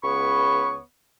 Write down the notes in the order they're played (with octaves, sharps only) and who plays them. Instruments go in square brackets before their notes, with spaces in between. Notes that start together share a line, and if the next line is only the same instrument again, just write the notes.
[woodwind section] C#2 B3 C#5 B5 C#6